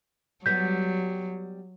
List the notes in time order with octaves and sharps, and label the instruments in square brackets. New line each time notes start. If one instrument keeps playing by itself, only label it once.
[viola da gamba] F#3 [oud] G3 B3 [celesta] G6 B6